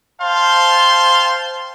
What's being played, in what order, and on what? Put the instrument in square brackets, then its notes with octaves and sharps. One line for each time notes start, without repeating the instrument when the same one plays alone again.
[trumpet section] C5 F5 G5 A5 C6